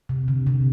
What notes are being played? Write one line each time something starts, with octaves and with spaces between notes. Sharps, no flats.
C3
D3
C3